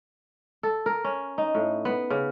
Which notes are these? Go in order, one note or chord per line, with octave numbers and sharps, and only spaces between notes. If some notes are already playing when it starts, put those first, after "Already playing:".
A4
A#4
C#4
D#4
A2
B3
C#3